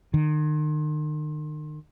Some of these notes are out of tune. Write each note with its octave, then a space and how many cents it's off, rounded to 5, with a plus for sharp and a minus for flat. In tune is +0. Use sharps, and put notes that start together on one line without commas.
D#3 -40